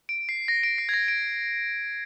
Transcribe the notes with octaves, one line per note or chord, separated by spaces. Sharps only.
D7
C7
A#6
D7
C7
G#6
A#6
D7